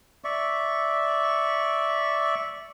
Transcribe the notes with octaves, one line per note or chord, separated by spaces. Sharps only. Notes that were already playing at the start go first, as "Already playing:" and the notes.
D5 E5 C#6